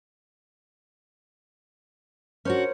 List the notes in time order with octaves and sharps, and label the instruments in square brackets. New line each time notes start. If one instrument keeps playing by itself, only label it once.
[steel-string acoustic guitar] C#4 D4 F#4 [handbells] A#4 C5 C#5